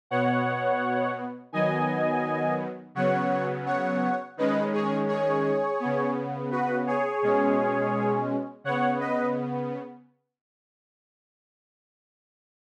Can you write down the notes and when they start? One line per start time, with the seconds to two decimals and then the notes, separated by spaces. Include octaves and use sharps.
0.11 B2 B3 C#5 F#5
1.52 D#3 F#3 B3 D#5 G#5
2.95 C#3 F#3 B3 C#5 F#5
3.66 C#5 F#5
4.37 D#3 G#3 C#4 B4 D#5
4.73 G#4 C#5
5.08 G#4 C#5
5.80 C#3 B3
6.51 F#4 B4
6.87 G#4 C#5
7.22 B2 G#3 C#4
8.64 C#3 B3 C#5 F#5
9.00 B4 D#5